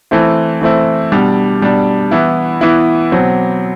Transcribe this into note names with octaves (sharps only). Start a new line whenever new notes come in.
E3 A3 C4 E4
E3 A3 C4 E4
B2 G3 D4
B2 G3 D4
E3 B3 E4
E3 B3 E4
B2 F#3 C4